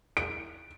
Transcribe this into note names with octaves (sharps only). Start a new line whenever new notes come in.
D7